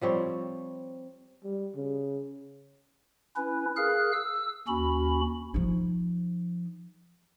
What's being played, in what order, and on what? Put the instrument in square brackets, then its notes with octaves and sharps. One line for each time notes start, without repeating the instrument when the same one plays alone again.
[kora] F3 G3 C4 C#5
[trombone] G3
C#3
[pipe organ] C#4 E4 B4
G#4 A#4 F5 F#6
E6
D#2 C#4 F#4 B5
[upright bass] F3 D#4